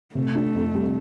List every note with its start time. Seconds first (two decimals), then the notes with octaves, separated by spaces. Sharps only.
0.15 C3 A3
0.35 D4
0.55 F2
0.75 G3